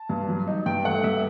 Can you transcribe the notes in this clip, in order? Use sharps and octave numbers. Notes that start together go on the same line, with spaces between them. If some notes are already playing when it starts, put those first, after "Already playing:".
Already playing: A5
G2
F#3
D#4
G2 G5
A3 F#5
G2 E5